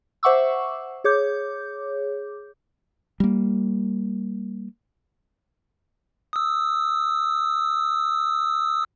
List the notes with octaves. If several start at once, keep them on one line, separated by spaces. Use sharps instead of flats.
C5 E5 F#5 C#6 D6 E6
G#4 C#5 D6 G6
G3 A#3
D#6 E6